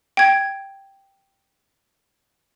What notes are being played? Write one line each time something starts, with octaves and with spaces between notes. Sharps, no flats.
G5 G#6